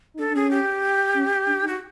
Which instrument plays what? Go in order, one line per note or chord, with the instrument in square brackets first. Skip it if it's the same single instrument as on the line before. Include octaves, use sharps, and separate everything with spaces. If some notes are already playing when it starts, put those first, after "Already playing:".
[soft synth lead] D#4
[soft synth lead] D4 [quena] A4
[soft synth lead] D4
[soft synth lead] C#4 [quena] G#4
[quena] G4
[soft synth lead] C#4
D4
D#4
[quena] F#4